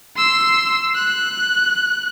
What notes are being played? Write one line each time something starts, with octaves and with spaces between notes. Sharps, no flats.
C6 E6
F#6